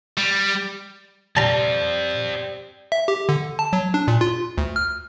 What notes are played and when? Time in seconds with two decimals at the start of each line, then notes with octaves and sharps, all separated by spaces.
0.18 G3
1.37 G3 C4 F4 A5 A#5
2.92 E5
3.08 G4
3.29 D3
3.59 A5
3.73 F#3
3.94 D4
4.08 A#2
4.21 F4
4.58 D2
4.76 F6